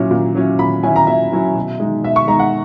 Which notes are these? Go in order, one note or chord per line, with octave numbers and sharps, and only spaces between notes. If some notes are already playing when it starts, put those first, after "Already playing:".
Already playing: A#2 F#3 C#4 E4
A#2
F#3 C#4 E4
A#2 B5
F#3 C#4 E4 G#5
A#5
A#2 E5
F#3 C#4 E4
B2
G#3 D#4
B2 E5
C#6
G#3 D#4 A#5
F#5